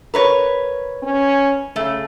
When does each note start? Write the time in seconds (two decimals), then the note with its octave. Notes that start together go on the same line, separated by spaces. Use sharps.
0.14 A#4 B4 C#5
1.03 C#4
1.76 C#3 A3